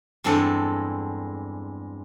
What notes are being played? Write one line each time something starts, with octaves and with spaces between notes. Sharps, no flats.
E2 G2 G#3 C4 A4 F#5